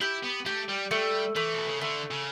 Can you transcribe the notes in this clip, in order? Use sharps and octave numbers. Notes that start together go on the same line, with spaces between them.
E4 G4
B3
A3 G4
G3
G3 A3
E3 A3
B2
C#3
D3 A3
C#3